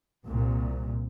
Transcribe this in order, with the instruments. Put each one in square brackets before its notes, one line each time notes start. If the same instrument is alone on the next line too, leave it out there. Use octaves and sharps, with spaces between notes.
[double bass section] C2 A#2